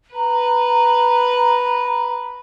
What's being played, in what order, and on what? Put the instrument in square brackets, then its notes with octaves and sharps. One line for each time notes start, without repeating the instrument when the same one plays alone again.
[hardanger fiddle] B4 [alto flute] A#5